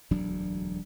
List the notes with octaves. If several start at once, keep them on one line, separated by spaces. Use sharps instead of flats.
E1 D2 F#3 D4